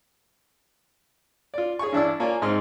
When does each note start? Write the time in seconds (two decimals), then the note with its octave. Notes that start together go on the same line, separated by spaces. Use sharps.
1.54 F4 D5
1.79 G#4 C#5 G#5 C#6
1.92 G2 E3 D4 E4 D5 E6
2.20 A#3 F4 C#5 D5 G#5
2.42 G#2 G#3 C4 C6 F6